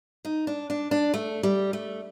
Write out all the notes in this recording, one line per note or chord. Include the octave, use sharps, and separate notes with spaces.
D#4
D4
D4
D4
A3
G3
A3